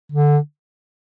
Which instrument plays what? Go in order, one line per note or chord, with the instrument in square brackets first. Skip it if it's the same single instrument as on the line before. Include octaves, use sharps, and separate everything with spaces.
[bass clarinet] D3